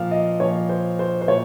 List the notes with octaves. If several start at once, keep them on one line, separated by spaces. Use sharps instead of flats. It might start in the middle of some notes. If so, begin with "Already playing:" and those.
Already playing: A#2 F3 F5
D#5
A#2 F3 C#5
C5
C5
C5
A#2 C#5